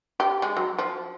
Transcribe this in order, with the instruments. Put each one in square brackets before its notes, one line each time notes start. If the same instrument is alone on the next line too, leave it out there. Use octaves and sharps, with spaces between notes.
[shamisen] G4
G#3
F#3
F3